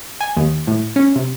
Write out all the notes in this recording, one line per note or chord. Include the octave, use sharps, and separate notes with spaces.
G#5
D#2
A2
C#4
C3